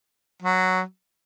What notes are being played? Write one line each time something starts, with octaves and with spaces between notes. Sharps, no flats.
F#3